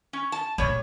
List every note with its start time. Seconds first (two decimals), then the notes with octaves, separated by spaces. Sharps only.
0.13 C#4
0.32 A5
0.58 A#1 C#3 G3 C#5